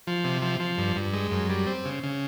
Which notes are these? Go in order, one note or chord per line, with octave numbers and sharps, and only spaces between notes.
F3
C3
F3
F3
G2
G2
G#3
F#2
G3
C4
C#3
C#3